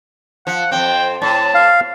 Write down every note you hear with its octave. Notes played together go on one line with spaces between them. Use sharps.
F3 F#5
F2 A#2 C4 G5
A2 A5
F5